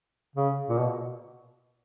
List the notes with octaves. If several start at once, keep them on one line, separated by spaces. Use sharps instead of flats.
C#3
A#2
B2